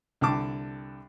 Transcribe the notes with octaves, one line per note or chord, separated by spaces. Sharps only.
C2 D3 A5 D6